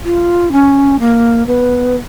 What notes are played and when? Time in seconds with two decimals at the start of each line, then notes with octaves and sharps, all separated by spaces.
0.04 F4
0.52 C#4
0.99 A#3
1.46 B3